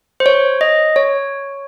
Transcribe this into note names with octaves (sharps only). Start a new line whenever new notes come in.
C5
C#5
D#5
C#5